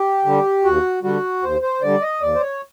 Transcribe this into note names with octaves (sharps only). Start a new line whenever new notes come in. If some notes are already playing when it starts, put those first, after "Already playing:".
Already playing: G4
D3 G3
D#2 F#4
D3 G3 F#4
D#2 C5
C5
D3 G3 D5
D#5
D#2 D5
C5
C#5